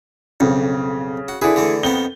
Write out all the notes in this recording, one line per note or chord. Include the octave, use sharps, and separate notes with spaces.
B1 F2 C#3
F#4
D3 E4 G#4 B4
D3 E3 A3
F2 D#3 B3 G7